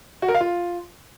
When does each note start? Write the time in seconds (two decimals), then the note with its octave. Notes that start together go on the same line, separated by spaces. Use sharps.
0.22 F#4
0.28 A#4
0.35 F5
0.41 F4